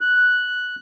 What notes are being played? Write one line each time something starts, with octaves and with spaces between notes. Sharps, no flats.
F#6